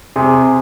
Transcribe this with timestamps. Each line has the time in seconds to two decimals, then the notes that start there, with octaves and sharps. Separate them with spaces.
0.16 C3 G#4